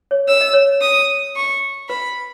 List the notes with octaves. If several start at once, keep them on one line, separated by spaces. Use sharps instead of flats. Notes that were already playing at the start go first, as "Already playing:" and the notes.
C#5
C#5 E6
D#5
C#5
D#6
C#6
B4 B5